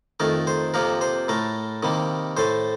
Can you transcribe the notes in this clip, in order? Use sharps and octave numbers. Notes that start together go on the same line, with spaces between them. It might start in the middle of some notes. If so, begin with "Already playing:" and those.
F2 D#3 A3 A#4
C5
F2 C3 F3 A#3 A#4
C5
A2 A3 A#4
C3 D#3 G3 A#3
A2 A3 C5